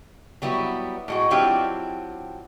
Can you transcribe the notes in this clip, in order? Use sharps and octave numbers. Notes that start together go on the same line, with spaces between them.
F#3 G3 B3 E4
A2 G#3 F#4
F#3 C4 D4 E4 F4 G4